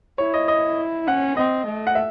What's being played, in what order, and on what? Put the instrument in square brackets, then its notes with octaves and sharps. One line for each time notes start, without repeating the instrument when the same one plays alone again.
[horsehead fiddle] E4 [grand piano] C#5
[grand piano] D#5
D#5
[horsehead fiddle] C#4 [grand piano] F#5
[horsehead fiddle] C4 [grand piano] D#5
[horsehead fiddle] A3
[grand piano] F#5
E5